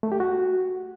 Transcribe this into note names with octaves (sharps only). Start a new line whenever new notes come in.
A3
G4
F#4